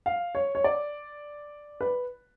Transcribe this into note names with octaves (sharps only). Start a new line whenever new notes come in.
F5
C#5
C#5
D5
B4